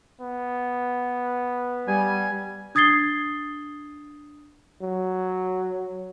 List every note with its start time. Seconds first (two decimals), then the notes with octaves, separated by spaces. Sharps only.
0.21 B3
1.87 G3 G#5
2.75 D4 D#6 G#6 A6 C7 G7
4.82 F#3